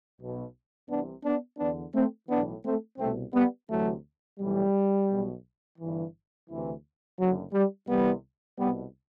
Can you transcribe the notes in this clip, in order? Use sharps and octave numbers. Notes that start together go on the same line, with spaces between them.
B1 B2
C2 C3 E3 B3 D4
B3 D4
E2 D3 B3 D4
A3 C4
B1 A2 E3 B3 D4
A3 C4
C2 B2 A3 C4
G3 B3
D2 C3 E3 F#3 A3
B1 A2 E3 G3
B1 B2
G1 G2 E3
D2 C3 E3
F#1 F#2 D3 F#3
G3
C2 C3 E3 G3 B3
C2 B2 G3 B3